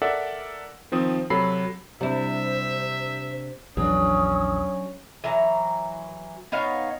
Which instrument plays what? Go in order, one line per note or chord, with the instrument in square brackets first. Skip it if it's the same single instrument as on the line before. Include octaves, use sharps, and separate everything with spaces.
[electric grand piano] A4 A#4 D5 E5 F#5
D#3 F3 C4 D#6
C3 F#3 A4 B5 C7
[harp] C3 D4 [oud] G3 E4 [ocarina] C5 [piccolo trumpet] E5
[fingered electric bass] A#1 E2 [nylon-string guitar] F#3 D4 [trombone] C#4 [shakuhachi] D#6
[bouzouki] E3 F#3 A#5
B3 D#4 C#5 F5